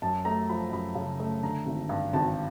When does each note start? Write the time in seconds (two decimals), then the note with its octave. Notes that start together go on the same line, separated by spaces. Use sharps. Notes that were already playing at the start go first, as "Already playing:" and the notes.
0.02 F#2 A5
0.25 A3 A#5
0.49 F3 B5
0.72 F#2 B5
0.95 C#3
1.20 A3
1.43 D3 A#5
1.66 G#1
1.89 G2
2.13 G#1 A5